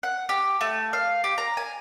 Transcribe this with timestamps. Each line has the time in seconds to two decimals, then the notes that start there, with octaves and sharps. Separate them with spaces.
0.03 F#5
0.29 G4
0.61 A3
0.93 F5
1.24 G4
1.38 A#5
1.57 G#5